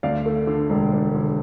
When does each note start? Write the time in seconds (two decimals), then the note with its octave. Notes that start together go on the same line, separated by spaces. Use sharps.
0.03 D2 D5 F5
0.26 A3
0.47 D3
0.70 E1
0.92 E1
1.14 D3